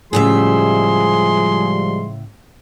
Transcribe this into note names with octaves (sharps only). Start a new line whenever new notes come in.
A2 C#3 F3 G3 G#3 G#4 E5 C6